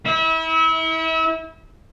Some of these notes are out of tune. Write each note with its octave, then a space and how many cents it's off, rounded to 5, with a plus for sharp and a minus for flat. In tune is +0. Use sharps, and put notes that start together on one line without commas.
E4 -30 E5 -35